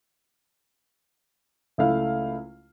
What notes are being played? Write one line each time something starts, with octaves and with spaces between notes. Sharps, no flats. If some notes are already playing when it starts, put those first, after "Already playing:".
C#2 A3 E4 F5 F6